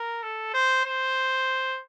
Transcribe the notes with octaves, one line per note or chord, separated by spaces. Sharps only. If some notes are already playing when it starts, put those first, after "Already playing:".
Already playing: A#4
A4
C5
C5